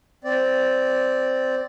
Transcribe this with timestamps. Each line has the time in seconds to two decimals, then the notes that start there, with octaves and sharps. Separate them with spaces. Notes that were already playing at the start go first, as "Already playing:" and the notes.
0.24 C4 D5